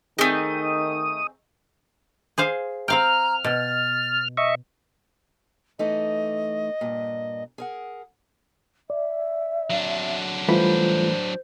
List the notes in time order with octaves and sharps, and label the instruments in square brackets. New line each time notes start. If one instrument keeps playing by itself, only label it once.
[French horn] D#3 [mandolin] A3 D#4 [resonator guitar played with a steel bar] C4 G#4 [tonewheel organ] D#6
[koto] G#4 C5 F5
[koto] C4 F5 G5 [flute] A#5 [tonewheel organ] F6
[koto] B2 [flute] A6
[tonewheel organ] D#5 E5 C#6
[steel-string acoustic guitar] E3 A3 D#4 [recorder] D#5
[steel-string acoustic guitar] G2 A#2
G#4 A#4 F#5
[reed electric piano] D5 [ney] E5
[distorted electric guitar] F#3 D4
[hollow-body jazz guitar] E3 A3 B4 [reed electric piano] G3 F4 [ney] C5